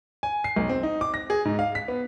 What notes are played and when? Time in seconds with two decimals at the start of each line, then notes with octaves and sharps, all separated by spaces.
0.23 G#5
0.44 C7
0.56 B1
0.69 C4
0.83 D#4
1.01 D6
1.14 A#6
1.30 G#4
1.45 G#2
1.59 F5
1.75 B6
1.88 B3